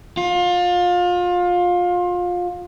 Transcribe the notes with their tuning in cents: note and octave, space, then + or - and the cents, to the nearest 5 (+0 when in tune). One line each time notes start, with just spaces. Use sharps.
F4 +25